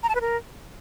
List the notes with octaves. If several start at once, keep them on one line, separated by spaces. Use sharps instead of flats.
A#5
A5
B4
A#4